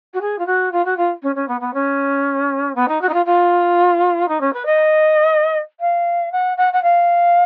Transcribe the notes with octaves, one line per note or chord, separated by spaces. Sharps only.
F#4
G#4
F4
F#4
F4
F#4
F4
C#4
C#4
B3
B3
C#4
B3
D#4
F#4
D#4
F4
F4
D#4
C#4
B4
D#5
F5
F#5
F#5
F#5
F5